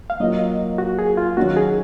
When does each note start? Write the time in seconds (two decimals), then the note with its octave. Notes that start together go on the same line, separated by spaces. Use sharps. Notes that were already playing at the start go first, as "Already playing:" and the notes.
0.10 F5
0.20 F#3 A#3 F4 D#5
0.78 F#4
0.99 G#4
1.17 F4
1.37 D#3 F#3 C#4 F#4
1.56 G#4